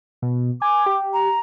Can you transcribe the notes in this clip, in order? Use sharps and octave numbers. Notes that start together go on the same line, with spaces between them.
B2
G#5 D6
G4
A#5